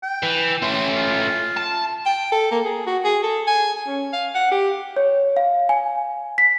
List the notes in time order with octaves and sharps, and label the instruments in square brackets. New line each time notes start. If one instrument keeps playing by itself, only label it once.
[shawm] G5
[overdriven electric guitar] E3
[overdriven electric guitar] A3 C#4 [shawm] C6
[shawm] F4
[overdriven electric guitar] A5
[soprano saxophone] G5
A4
A#3
G#4
F#4
G#4
A4
G#5
C#4
F5
F#5
G4
[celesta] C#5
F5
G#5
B6